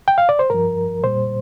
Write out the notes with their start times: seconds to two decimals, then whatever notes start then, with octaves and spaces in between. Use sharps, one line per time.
0.08 G5
0.18 F5
0.29 D5
0.39 C5
0.50 G2 F3 A#4
1.04 A#2 G3 C5